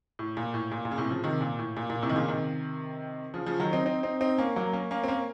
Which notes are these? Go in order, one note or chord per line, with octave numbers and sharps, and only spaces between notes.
A2
A#2
A2
A#2
A#2
C#3
A2 C3
C#3 F3
C3 D#3
A#2
A2
A#2
A#2
A2 C3
D#3
A#2 C#3
C3 D#3
C#3 F3
C#3 F3
D#3 F#3
C4 D#4
C4 D#4
C4 D#4
C4 D#4
A#3 C#4
F#3 A#3
A#3 C#4
A#3 C#4
C4
A#3 C#4